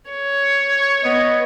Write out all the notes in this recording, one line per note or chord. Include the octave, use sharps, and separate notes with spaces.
C#5
B3 D#5